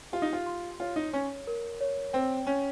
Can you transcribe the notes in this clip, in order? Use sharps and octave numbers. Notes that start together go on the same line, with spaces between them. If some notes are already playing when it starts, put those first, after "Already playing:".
F4 G4
D#4
F4
C6
F4 C#5
D#4
C#4 C#5
A#4
C#5
C4 G5
C#4 C#5